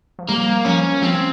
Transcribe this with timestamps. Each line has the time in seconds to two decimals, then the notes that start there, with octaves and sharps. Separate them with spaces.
0.19 F3
0.29 G3 A#3
0.65 F3 C#4
1.02 F3 C4